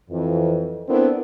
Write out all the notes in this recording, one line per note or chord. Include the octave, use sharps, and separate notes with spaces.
F2 E3
B3 C4 D4 E4 A4 A#4